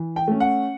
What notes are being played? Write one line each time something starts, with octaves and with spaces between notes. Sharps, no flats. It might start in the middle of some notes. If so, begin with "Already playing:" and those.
Already playing: E3
G5
A3 C#4
F#5